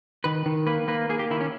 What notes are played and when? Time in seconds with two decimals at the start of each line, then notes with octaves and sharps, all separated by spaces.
0.24 D#3 B4
0.46 D#3
0.67 A#3 B4
0.88 A#3 B4
1.09 A#3 G#4
1.19 G4
1.30 D#3 E4
1.41 C#4